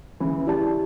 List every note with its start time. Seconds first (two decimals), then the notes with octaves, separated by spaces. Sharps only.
0.20 C#3 E3 C#4
0.47 E4 G4 D5 A5